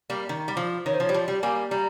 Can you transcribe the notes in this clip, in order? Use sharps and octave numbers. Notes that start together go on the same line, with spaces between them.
G3 A#3
D#3
G3
F3
D#3 C#5
C5
F3 C#5
G3
F3
G3
G3 A#3 G#5
G3 A#5